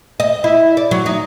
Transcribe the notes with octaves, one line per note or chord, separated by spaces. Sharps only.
D#5
E4
D5
F#3
D#4